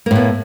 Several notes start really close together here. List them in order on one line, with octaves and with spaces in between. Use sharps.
A#3 A2 B3